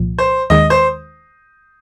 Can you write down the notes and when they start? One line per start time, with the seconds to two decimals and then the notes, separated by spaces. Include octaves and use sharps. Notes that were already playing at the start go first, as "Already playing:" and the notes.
Already playing: C2 A#2 F3
0.18 C5
0.50 D#2 D#3 G#3 D#5
0.70 C5